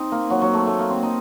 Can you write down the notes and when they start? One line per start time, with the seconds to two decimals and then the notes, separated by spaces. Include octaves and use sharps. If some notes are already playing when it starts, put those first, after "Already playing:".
Already playing: C4 D#4
0.12 A#3
0.30 F#3
0.42 F#3
0.54 A3
0.67 A3
0.79 A#3
0.90 C4
1.03 D#4